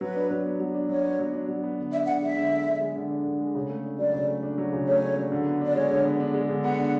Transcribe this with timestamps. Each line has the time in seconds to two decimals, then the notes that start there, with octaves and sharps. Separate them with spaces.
0.01 F#3 B4
0.15 D4
0.31 F#3
0.45 B3
0.60 F#3
0.75 D4
0.89 F#3 C#5
1.04 B3
1.19 F#3
1.34 D4
1.48 F#3
1.63 B3
1.78 D3
1.92 D4 E5
2.07 D3 F#5
2.22 G#3 E5
2.36 D3
2.51 D4
2.66 D3
2.81 G#3
2.95 D3
3.10 D4
3.25 D3
3.40 G#3
3.55 C#3
3.70 A3
3.84 D4
3.98 F#3 D5
4.13 C#3
4.28 A3
4.43 D4
4.58 F#3
4.73 C#3
4.87 A3 C#5
5.02 D4
5.17 F#3
5.32 D3
5.46 B3
5.61 D4 D5
5.75 G#3 C#5
5.91 D3
6.05 B3
6.20 D4
6.34 G#3
6.49 D3
6.64 B3 F#5
6.79 D4